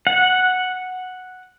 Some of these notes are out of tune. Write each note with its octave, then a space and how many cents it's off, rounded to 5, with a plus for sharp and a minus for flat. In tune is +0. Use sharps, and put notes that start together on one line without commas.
F#5 -5